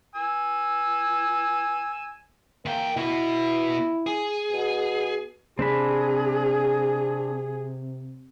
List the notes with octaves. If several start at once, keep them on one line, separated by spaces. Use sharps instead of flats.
G#5 E6
E2 A#3 G5
B2 E4 F#4
G#4
B2
C3 C4 D4 G#4 B5